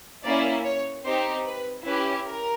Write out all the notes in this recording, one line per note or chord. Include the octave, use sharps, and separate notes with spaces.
A#3 C#4 E4 D5
C#5
C4 D#4 G4 C5
B4
C#4 E4 G4 B4
A#4